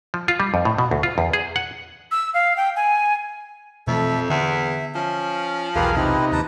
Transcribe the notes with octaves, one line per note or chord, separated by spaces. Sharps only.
F3
F4
G3
F2
A2
B2
D2
F4
E2
G#4
F#5
E6
F5
G5
G#5
F2 B2 E3 A3 A4 E5
E2 D3 E5
F3 C#4
B1 E2 F4 G4 G#4 A#4 B4 F5
C3 C4 D#4 E4 B4
D#2 B4 A5 A#5